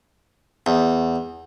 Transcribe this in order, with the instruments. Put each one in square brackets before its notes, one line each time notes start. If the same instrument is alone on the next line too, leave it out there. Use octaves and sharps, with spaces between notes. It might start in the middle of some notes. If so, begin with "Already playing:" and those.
[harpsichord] E2